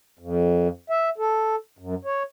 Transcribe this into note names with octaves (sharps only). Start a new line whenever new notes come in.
F2
E5
A4
F#2
C#5